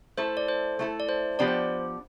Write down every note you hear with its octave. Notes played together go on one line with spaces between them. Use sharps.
A3 E4 A4 C5
D5
C5
A3 E4 A4
D5
C5
F3 B3 D4 G4 D5
C5